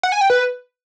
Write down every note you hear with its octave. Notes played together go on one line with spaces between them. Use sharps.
F#5
G#5
G5
B4